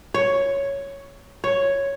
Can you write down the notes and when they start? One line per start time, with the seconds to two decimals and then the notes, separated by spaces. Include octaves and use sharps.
0.14 C#5
1.44 C#5